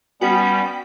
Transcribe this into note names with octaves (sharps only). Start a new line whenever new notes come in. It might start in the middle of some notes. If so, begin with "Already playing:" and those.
G3 B3 C#4 F#4 G5 B6